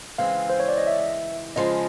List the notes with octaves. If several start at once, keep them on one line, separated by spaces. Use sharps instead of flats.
C#3 E3 G#3 C4 F5
C5
C#5
D5
D#5
E5
C#3 F3 G#3 D#5